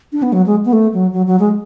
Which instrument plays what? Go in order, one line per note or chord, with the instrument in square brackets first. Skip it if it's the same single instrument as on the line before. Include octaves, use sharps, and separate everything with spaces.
[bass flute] D4
B3
F#3
G#3
B3
A3
F#3
F#3
F#3
G#3